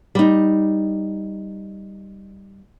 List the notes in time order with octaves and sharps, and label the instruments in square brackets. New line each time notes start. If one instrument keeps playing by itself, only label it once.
[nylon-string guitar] G3 D#4